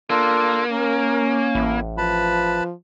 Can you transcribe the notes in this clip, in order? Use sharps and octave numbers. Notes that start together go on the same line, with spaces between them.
A#3 D4 F4 A4
C#4 A#4
A1 E4
F3 B4 A5 B5